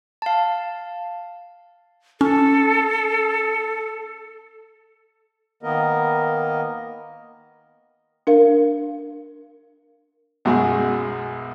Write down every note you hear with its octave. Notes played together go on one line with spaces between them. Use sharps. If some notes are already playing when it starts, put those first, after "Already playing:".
F5 A5
C#4 A4
D#3 A#3 B3 A#4 D#5
D4 A#4 F5
B1 F#2 G#3 F#4 G#4